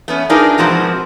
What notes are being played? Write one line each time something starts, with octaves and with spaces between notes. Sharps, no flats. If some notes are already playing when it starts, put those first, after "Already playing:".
A3 B3 C#4
D4 D#4 F4 G#4 A#4 B4
G#2 B2 F3 C4 F#4 A#4